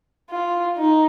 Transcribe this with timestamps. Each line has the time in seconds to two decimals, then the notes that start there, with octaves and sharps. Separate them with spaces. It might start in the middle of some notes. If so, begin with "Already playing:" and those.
0.30 F4
0.78 D#4